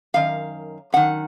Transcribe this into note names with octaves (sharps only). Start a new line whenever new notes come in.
F#2 D#3 F5
F#2 D#3 F#5